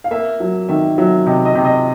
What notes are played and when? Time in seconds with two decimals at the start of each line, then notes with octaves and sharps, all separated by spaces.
0.04 F5
0.11 A#3 E5
0.40 F#3
0.69 D#3 E5
0.98 F#3 E5
1.26 C3 D#5
1.45 D#5
1.55 C3
1.65 D#5